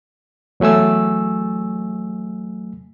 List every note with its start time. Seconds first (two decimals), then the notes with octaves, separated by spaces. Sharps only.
0.60 E2 F#3 A3 G#5 E6